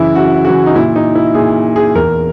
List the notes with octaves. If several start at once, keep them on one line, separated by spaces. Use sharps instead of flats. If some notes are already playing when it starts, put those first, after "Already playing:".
Already playing: F#2 C#3 E3 E4
F#2 F#4
C#3 E3 F#4
D#4
A#2 E4
D#4
E4
A#2 G#4
G#4
E2 A#4